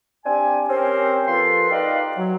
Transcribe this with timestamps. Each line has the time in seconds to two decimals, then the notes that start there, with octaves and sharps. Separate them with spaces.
0.26 C4 D4 G4 G#5
0.69 C4 C#4 G4 A#4 C5
1.27 F3 A#3 F4 A4 B4 C6
1.71 D#4 G4 B4 D5 D#5 F5
2.17 F#3